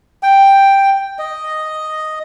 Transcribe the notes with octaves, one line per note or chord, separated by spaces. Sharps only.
G5
D#5